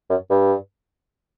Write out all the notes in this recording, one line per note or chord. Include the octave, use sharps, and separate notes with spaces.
F#2
G2